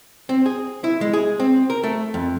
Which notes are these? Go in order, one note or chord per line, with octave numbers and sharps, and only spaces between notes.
C4
G#4
E4
G#3
G#4
C4
A#4
A3
F2